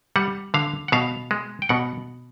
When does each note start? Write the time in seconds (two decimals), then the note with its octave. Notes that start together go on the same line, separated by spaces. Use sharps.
0.16 G3 F#5
0.54 D3 F5
0.88 F#5
0.92 B2 F5
1.31 G#3
1.62 G5
1.69 B2 F#5